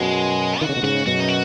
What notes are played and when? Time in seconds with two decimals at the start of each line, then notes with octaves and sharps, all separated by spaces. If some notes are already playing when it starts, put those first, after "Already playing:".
Already playing: F#2 B2 G#3
0.61 D#3 F#4
0.69 C#3
0.77 B2
0.83 G#2 C#3 F#4
1.06 F#2 B2 F#4
1.20 D#4
1.28 F#4